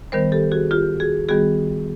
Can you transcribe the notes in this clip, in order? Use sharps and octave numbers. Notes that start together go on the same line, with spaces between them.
D#3 G3 B3 A#4 C5
G4 A4
F#4 G#4
F4 G4
F#4 G#4
D#3 G3 B3 F#4 G#4